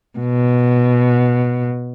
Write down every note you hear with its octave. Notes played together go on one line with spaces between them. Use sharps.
B2